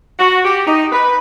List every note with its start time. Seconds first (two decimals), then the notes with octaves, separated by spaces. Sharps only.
0.19 F#4
0.45 G4
0.67 D#4
0.92 B4